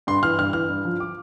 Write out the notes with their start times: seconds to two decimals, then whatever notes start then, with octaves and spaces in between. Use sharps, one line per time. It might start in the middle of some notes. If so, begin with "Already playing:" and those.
0.07 G2 C6
0.23 E3 F6
0.38 G2 F6
0.53 E3 F6
0.69 G2
0.85 F3
1.00 D6